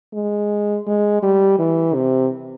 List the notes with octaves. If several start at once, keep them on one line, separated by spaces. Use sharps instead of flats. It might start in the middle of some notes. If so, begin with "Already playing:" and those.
G#3
G#3
G3
E3
C3